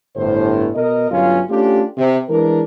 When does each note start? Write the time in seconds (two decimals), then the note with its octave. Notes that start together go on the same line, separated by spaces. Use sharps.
0.16 G1 A2 C5
0.75 B2 A#4 D#5
1.11 G1 F#3 C#4 F4
1.50 A3 C#4 D4 F4 G4
1.98 C3
2.29 E3 G#3 D4 A#4